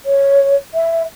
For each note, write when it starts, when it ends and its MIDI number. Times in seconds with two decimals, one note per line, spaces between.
0.05 0.55 73
0.74 1.02 76